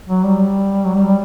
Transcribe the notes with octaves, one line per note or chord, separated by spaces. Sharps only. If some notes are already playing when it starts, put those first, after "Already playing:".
F#3
G3
F#3
G3
G3